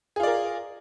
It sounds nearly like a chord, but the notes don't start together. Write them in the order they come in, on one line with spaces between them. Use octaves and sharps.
G#4 F4 D5 A#4